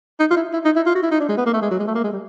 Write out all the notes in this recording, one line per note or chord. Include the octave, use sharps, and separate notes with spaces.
D#4
F4
E4
E4
D#4
E4
F4
F#4
E4
D#4
D4
G#3
B3
A#3
A3
G#3
F#3
G#3
A3
A#3
G#3
G3